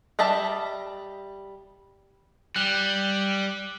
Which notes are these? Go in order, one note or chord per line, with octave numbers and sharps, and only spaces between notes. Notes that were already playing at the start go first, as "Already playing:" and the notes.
G3 D#5 E5 A5
G3 F#6 F#7 G7